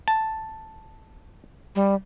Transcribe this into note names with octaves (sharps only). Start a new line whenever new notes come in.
A5
G3